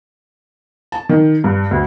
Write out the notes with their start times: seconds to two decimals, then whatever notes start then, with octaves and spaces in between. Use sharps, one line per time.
0.92 A5
1.09 D#3
1.44 G2
1.71 D2